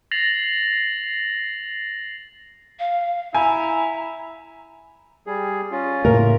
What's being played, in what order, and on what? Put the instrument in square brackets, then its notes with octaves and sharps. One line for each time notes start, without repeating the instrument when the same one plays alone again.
[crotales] A6 A#6 C7 F7 F#7
[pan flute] F5
[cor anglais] E4 [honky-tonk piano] G#5 [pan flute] A#5
[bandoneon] G3 G#4
C#4 F4
[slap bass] A2 C#3 A3 [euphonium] A#3 [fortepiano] A#4